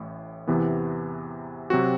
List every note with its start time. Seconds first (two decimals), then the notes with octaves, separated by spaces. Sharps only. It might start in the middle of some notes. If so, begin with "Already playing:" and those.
Already playing: A1 A2
0.47 E2 C3 E3 B3
1.70 C3 F#3 C4 F#4